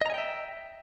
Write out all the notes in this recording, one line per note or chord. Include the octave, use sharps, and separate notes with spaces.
D#5 E5 G5 G#5 A#5